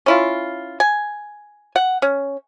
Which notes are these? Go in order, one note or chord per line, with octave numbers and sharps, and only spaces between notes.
C#4 E4 F4
G#5
F#5
C#4